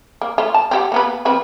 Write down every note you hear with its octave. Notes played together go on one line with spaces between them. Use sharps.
A#3
A3 F4
A5
C4 G4 F#5
A#3 B3 B4
F3 C4 B4